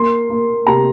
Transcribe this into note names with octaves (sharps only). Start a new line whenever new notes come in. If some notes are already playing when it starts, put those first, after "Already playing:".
Already playing: A#3 C6
A#3
C3 A#5